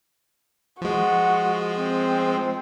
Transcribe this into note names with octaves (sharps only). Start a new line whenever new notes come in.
F3 G#3 F#4
C4